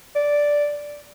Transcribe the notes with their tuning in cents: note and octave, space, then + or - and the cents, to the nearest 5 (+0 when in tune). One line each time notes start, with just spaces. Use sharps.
D5 -5